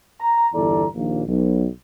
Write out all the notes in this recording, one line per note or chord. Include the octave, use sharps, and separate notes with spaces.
A#5
G1 E2 E4 A4 D5 A#5
A#1 D#2 A#3
B1